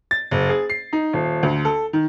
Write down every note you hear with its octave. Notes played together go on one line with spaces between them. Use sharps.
A6
F#1
G#4
C7
D#4
D#1
D2
A4
D#3